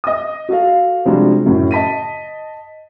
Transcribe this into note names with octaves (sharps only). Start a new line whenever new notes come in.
D#5 D#6
F#4 A4 F5
C3 F3 G3 G#3 D4 F#4
F#2 A2 C#3
D#5 A5 B6 D#7